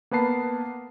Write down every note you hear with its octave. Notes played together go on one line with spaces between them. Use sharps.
A#3 B3 B4 A5 C7